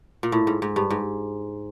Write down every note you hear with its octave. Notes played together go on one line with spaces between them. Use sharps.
A#2
A2
G#2
G#2
G2
G#2